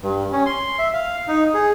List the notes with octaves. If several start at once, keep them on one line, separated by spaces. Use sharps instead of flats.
G2
C#4
C6
E5
F5
D#4
G#4